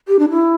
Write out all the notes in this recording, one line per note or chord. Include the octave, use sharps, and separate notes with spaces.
G4
D4
E4